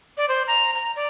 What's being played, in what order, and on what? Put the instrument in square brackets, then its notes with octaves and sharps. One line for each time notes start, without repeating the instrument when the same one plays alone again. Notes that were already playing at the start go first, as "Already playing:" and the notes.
[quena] D5
C5
A#5
A#5
D5